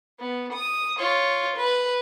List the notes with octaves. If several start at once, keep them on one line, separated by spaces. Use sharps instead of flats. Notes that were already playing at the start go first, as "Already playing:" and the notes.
B3
D#6
F4 C#5
B4